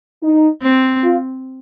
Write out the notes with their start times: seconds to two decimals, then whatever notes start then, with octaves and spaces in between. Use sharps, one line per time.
0.23 D#4
0.62 C4
1.04 F4